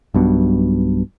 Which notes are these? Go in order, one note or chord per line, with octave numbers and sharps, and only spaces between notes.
B1 G2 B2